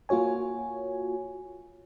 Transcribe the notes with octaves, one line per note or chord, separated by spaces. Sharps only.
A#3 F4 F#4 C#5 G#5